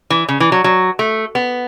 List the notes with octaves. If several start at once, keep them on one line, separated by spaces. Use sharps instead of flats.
E3
C#3
E3
F#3
F#3
A3
B3